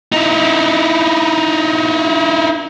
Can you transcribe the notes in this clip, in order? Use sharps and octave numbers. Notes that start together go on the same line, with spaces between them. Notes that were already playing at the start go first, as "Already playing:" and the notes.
D#4 E4